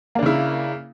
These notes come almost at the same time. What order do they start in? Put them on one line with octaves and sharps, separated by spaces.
A#3 D4 C#3 E4